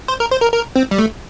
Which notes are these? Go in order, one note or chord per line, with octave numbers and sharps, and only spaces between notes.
C5
A#4
C5
A#4
A#4
C4
G3
A3